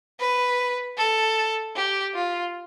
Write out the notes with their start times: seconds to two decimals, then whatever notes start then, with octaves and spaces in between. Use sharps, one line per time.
0.20 B4
0.97 A4
1.76 G4
2.15 F4